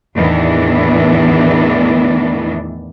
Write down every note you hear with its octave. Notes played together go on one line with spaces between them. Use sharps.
E2 A2 D#3 E3 B3 D4